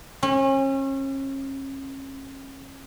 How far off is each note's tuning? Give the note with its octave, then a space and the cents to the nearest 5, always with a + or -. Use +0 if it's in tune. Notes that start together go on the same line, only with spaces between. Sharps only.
C#4 -35